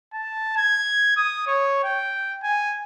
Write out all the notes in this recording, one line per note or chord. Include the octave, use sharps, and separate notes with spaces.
A5
G#6
D#6
C#5
G5
G#5